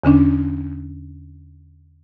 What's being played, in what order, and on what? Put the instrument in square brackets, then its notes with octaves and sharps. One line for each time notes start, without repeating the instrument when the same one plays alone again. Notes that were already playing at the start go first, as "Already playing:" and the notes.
[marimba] E2 D3 C#4 D4